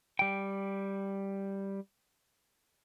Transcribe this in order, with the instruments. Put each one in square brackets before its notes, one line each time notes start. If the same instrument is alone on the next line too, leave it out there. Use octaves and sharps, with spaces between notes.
[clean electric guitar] G3 G5